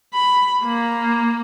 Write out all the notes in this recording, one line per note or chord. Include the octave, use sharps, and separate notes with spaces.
B5
A#3